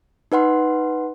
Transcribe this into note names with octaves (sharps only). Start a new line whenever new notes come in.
D#4 B4 F#5 C6